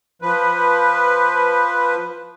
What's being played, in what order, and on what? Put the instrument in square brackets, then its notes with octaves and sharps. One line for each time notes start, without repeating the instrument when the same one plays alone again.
[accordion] F3 B4